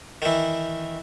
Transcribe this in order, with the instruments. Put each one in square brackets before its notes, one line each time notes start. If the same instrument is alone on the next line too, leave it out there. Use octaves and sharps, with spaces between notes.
[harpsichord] D#3 E3